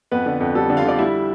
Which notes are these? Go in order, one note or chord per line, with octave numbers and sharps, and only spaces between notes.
F2 B3 B4
D3
F2
G3 A4
D3
F4 F5
D3 D5
G3 E4 E5